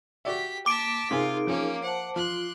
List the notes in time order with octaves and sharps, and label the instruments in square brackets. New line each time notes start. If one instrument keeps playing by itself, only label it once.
[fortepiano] F#4 D5 E5 [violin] G4 B6
[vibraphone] A#3 [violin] A5 B6 [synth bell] D6 D7
[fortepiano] C3 C4 G#5 [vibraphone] D#4 G#4 A#4 [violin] F4
[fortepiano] F3 [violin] A#3 C#4
[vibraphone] C5 A5 [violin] F#5
[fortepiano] F3 [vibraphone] F4 [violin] C6 F#6